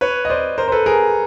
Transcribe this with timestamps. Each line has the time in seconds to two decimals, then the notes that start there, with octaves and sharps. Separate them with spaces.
0.01 B4 C#5
0.25 D#5
0.30 C5 D5
0.58 A#4 C5
0.68 C5
0.72 A4 B4
0.86 G#4 A#4